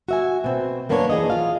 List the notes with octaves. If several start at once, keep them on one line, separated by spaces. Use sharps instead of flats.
F#4 E5 G#5
B2 C4
F#2 A#3 B3 D4 F#4 C#5
E3 G#4 D5 D#5
F4 F5